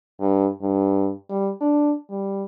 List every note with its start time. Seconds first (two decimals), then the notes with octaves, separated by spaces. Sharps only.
0.20 G2
0.61 G2
1.29 G3
1.61 D4
2.09 G3